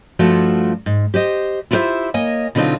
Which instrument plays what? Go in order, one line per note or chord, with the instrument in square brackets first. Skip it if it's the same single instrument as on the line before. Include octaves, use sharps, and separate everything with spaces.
[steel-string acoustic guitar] G2 F3 A3 F4 F#4
G#2
G4 C5 D#5
E4 F4 G4 A#4 C5 E5
A#3 C#5 D#5 G#5
B2 D3 F#3 C4 D#4 F4